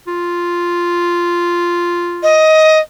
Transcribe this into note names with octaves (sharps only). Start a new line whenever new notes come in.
F4
D#5